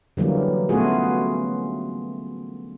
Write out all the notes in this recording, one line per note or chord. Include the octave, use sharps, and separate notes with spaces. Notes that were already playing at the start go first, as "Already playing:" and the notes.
D3 E3 F#3 G3 A#3
A3 B3 C#4 F4 F#4 G#4